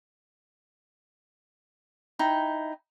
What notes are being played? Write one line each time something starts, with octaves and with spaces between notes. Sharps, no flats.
D#4 E4 G5